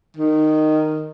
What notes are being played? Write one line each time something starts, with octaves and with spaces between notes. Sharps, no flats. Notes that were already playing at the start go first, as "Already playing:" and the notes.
D#3